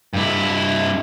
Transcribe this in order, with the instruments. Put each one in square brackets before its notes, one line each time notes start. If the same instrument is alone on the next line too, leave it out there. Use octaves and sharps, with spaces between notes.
[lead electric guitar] G2 E4